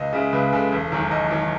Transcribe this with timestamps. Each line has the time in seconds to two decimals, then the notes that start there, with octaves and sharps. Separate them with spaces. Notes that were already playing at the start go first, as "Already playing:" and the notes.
Already playing: C#2 D#5
0.13 C#3 G#3 E5
0.33 C#2 B4
0.53 C#3 G#3 A4
0.72 E1
0.92 E2 D#3 F#3
1.11 E1 D#5
1.31 D#3 F#3